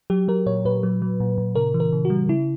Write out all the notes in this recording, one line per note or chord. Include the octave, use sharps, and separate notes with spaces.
F#3 G4
F#3 A#4
A#2 C#5
A#2 B4
F#3
F#3
A#2
A#2
C#3 A#4
E3
A#4
C#3
F#4
G3
C#3 E4